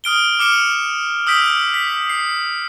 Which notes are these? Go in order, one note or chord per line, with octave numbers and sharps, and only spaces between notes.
D#6 F6 D7 G7
D6 F6 C#7 E7
D#6 E6 G6 B6 D7
B6
C7